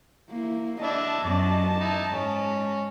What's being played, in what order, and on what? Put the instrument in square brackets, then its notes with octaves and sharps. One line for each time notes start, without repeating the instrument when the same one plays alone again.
[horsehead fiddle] A#3 E4
[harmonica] D4 E4 E5 [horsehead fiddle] D#5 A5
[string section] F#2 [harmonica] D5
[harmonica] D#4 E4
[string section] G#2 [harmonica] C#4